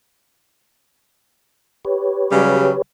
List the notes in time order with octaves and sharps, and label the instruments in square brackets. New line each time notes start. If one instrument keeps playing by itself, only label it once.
[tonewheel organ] G4 B4 C#5
[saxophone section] C#3 F#3 G3